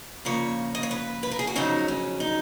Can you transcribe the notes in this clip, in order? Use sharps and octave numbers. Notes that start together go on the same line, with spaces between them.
C#3 F3 A#3 C#5
D#5
C#5
B4
B4
A#4
G#4
F#4
F2 C#3 F#3 C#4 D#4
C#4
D#4